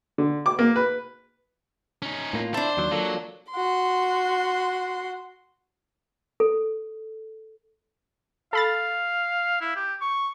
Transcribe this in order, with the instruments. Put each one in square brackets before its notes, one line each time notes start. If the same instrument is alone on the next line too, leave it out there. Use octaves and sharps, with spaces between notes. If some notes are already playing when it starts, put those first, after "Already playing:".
[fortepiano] D3
D6
A#3
B4
[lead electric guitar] C#4 D#4
[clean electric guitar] A2 A#3 F4
[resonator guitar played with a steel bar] D4 A5 [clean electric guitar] E4 [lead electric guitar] C5
[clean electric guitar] D#2 D#3 F#3
[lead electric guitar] F#3 [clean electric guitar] A#3 F4 A4
[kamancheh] F#4 C6
[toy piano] A4
[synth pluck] A4 B5 A6 [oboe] F5
[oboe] E4
G4
C#6